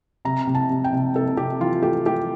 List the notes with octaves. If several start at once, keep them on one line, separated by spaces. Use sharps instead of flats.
C3 A#5
C3
A5
C3
G5
C3
C3 A4
C3 G4
E3 F4
A3 G4
A3 G4